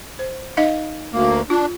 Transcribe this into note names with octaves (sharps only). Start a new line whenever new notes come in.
C5
D#4 D#5 F5
D2 A#3
D4 F4